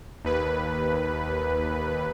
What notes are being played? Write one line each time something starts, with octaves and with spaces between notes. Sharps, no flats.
D#2 B4